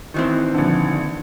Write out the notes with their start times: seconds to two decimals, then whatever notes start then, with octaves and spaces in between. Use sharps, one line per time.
0.14 D#3 E3 C4
0.54 A#1 D3